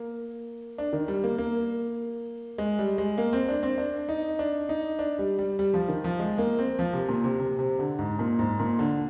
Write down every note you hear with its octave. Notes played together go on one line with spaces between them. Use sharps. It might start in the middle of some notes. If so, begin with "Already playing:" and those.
Already playing: A#3
D4
D#3
G3
A#3
A#3
G#3
G3
G#3
A#3
C4
D4
C4
D4
D#4
D4
D#4
D4
G3
G3
G3
F3
D#3
F3
G#3
A#3
C4
F3
C3
A#2
C3
C3
C3
D3
G#2
A#2
G#2
A#2
D3